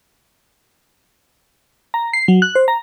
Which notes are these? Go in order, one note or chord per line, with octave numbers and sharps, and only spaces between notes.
A#5
C7
F#3
F#6
C5
A#5